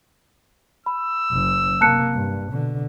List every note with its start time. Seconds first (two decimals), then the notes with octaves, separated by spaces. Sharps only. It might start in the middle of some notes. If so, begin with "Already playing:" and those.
0.86 B5 E6
1.32 F#1
1.81 C3 A#3 A5 F#6 C#7
2.15 G2
2.52 B2 D3